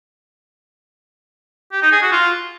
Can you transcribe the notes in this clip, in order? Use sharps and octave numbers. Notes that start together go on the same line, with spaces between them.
G4
D#4
G#4
F#4
F4